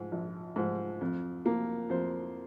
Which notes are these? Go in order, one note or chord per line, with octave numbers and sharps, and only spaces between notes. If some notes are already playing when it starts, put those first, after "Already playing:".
Already playing: G#2 F3
A#1
G#2 F3
F2
F3 A#3
F2 C5